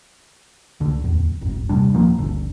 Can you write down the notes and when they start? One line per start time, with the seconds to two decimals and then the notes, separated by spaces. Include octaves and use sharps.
0.80 C#2 D3
1.02 D1 E2
1.41 D1 G1 F#2
1.69 D#1 C3 G3 D4
1.94 D#1 F3 A#3
2.18 G1 D2 D3